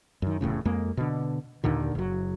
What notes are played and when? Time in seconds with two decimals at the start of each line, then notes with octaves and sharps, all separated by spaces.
0.22 F#2 D#3
0.41 E1 A#1 A2 C#3
0.65 F2 G#3 A#3
0.97 B2 D3
1.64 D#2 A#2 D3 D#3
1.95 F#1 F#3